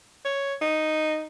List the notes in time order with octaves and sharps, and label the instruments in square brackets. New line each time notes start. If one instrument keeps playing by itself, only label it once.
[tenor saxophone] C#5
D#4